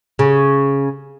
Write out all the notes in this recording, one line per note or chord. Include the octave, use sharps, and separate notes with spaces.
C#3